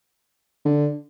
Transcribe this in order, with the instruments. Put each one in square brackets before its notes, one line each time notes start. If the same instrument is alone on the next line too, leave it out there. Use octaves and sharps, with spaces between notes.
[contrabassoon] D3